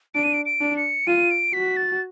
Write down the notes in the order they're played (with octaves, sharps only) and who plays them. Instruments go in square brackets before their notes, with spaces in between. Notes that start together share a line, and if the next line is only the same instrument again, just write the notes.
[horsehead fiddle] D4 [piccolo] D7
[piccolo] D#7
D7
D7
[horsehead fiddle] D4
[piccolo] C#7
[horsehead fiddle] F4 [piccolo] D#7
[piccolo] D7
[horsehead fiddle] F#4 [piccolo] B6
[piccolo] A6